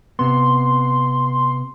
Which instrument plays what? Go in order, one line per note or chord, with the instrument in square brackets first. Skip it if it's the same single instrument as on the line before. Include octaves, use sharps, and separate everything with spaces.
[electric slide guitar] C3 B3 [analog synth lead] C6